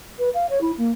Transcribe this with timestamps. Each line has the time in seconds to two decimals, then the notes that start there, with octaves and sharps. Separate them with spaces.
0.19 B4
0.34 F5
0.49 C#5
0.61 E4
0.78 A#3